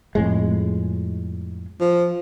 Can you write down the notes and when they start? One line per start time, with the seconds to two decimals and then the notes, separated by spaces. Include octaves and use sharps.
0.15 F2 A2 G#3
1.81 F3